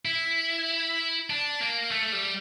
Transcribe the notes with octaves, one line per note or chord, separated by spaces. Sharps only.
E4
D4
A#3
A3
G3